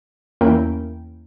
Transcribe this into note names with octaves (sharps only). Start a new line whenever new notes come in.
E2 A#3 C#4 E4 A#4 G5